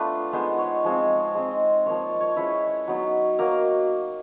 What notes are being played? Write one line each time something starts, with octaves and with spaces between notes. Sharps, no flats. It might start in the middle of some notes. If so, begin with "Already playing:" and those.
Already playing: A3 B3 D4 F4 B4
G#3 B3 D#4 C5
C#5
F3 G#3 C4 F4
G#3 C4 D#4
F3 A#3 D#4 C#5
D5
C#5
G#3 C#4 E4 B4
F#3 B3 D#4
F#3 A#3 D#4 A#4